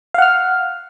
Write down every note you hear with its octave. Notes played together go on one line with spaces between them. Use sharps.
F5 F#5 F6